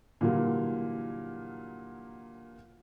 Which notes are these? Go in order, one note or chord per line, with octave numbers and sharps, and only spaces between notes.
A#2 D3 E3 F#3 G3 A#3